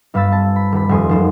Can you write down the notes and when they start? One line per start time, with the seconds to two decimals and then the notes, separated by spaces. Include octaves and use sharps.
0.14 G1 G2 F5 B5 E6 A6
0.32 C4 A5
0.56 B5
0.72 D#1 B5
0.89 D#1 F2 G#5 C6 D#6
1.09 F1 F#2 C5